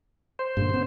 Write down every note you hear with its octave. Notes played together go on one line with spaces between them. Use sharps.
C5
G2 A#2 D3
C#3 B3 C4